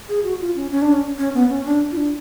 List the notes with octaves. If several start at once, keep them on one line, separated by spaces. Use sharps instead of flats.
G#4
F#4
F4
C#4
C#4
D4
C#4
C#4
B3
C#4
D4
F4
D4